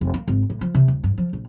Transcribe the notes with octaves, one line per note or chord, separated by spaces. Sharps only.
F1
A#3
G#1
A2
F3
C3
D#1
G2
F3
A#1